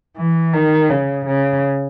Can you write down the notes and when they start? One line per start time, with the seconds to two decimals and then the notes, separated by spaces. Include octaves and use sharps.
0.17 E3
0.53 D#3
0.90 C#3
1.26 C#3